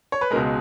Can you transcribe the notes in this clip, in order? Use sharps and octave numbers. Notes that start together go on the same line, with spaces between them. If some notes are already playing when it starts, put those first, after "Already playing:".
C#5
B4
C#2 B2 G#3 A#4